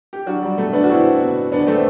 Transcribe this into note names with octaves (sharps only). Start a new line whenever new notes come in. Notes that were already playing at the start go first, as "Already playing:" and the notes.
G4
F#3 D4 F#4
G3
B2 A3
B3 D4
F#4
B2 C4 E4
B2
E2 B3 D4
A3 C4